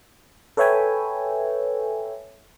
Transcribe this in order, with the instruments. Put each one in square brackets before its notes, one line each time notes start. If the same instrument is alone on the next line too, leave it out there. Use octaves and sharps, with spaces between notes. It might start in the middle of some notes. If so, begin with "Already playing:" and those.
[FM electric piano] A4 B4 C#5 E5 G5 G#5